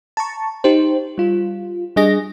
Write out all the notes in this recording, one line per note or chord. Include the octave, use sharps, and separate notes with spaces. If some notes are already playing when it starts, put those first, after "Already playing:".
A5 A#5 C#6
D#4 G4 C5
G3 F4
G3 D4 G#4 D#5 A#6